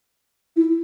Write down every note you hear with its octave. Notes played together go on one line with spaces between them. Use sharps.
E4